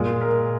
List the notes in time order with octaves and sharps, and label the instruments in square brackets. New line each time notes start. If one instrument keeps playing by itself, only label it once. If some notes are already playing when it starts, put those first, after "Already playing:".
Already playing: [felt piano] A#2 [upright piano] G#3 F4
[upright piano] A#4